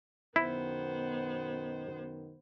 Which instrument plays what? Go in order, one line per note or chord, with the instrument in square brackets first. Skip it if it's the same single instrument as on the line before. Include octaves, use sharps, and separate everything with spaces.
[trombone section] F#2 B2 D#3 [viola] B3 C5 [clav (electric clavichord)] E4